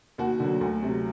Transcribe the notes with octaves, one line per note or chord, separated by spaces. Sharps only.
D#2 F#4
D3 F#3
D2
C3 F#3